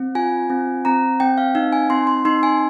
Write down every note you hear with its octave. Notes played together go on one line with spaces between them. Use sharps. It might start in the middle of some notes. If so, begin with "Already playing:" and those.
Already playing: C4
F4 G#5
C4
C4 A#5
C4 G5
F5
D#4 F5
G#5
C4 C6
C6
D#4 C6
G#5